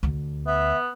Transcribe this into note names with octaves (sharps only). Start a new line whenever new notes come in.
D2 D3
B3 E5